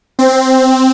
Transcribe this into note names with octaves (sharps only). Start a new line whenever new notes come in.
C4